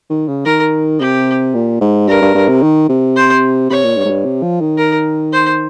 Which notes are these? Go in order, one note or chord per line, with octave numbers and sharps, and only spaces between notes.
D#3
C#3
D#3 A#4
C3 G4
A#2
G#2
G2 A#4
G2
G2
C3
D#3
C3
C5
C3 C#5
A#2
G2
G#2
G2
C3
F3
D#3
A#4
C5